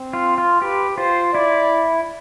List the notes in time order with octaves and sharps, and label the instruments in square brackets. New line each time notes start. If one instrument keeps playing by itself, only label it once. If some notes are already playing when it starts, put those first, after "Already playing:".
Already playing: [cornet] C4
[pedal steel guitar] F4
F4
[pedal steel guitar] G4 [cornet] B4
[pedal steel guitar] F4 [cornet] C5
[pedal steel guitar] E4 [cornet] D5